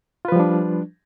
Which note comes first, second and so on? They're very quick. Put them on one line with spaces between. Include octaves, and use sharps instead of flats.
F4 B4 F3 G3 D4